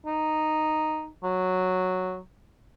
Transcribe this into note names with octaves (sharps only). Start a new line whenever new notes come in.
D#4
F#3